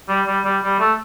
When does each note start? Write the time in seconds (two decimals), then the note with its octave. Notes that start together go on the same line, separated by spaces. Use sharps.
0.09 G3
0.27 G3
0.45 G3
0.63 G3
0.80 A3